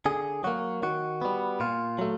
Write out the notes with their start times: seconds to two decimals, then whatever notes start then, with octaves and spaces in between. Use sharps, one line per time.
0.06 D3 G#4
0.44 F#3 A#3 F#4
0.83 D#3 F#4
1.22 G3 B3
1.60 A#2 F4
1.98 F#3 A3